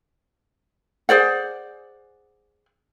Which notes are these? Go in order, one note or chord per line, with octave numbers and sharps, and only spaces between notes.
G#4 C5 D5 F#5